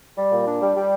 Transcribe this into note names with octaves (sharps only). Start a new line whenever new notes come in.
G3
A#2
D4
G3
G3